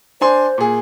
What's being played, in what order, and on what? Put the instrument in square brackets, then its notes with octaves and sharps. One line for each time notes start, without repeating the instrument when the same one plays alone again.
[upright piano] D4 G#5 C6 [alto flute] C5
[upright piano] A#2 G#4